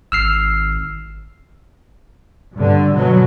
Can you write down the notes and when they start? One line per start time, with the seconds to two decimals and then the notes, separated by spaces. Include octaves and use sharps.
0.12 G#1 E6 F6 C7
2.53 G2 D3
2.92 B2 F#3